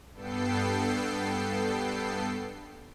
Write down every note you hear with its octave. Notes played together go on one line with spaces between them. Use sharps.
G2 B3 A4 G5 C7